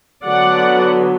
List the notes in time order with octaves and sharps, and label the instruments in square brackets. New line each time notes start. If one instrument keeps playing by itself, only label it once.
[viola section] D3 F#3 B3 D5 F#5